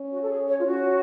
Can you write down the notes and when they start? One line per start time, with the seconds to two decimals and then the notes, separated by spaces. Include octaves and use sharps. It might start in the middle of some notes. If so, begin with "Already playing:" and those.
Already playing: C#4
0.12 F#4
0.23 A4
0.29 G#4
0.47 C#5
0.59 F4
0.65 C#4 F#4